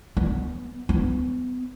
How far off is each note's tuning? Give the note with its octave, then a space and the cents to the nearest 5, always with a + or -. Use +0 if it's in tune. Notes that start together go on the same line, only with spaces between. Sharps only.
B3 +0
B3 +30